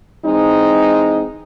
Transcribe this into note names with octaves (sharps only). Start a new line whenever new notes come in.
E3 G#3 C4 D#4